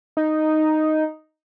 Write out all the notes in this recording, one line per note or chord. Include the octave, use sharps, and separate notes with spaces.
D#4